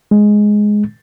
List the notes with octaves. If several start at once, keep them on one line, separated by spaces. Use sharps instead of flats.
G#3